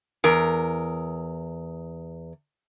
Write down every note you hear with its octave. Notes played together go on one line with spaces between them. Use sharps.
E2 A#4